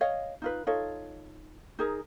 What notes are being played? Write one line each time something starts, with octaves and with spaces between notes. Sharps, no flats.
C#5 D#5 F5
D#4 F4 B4
D#4 F4 A4 C#5
D#4 G#4 A#4